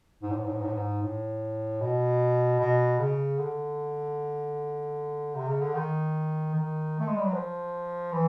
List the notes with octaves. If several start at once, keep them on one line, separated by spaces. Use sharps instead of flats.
G#2
A2
G#2
A2
G#2
A2
G#2
A2
B2
B2
C#3
D3
C3
C#3
D3
D#3
D#3
A3
G#3
G3
F#3
F3
E3